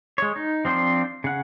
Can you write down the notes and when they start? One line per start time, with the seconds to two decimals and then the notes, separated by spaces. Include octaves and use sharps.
0.18 G#3 C#5
0.36 D#4
0.65 F3 C4 D4 C5
1.24 C#3 F#5